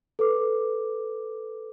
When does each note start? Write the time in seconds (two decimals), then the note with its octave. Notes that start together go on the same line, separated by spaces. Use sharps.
0.19 A4 B4 D6